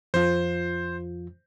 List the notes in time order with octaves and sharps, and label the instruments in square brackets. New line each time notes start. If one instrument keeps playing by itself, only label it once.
[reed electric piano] F2 F3 F4 [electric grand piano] C5